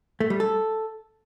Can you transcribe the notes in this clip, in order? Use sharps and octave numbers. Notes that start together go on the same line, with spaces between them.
A3
G3
A4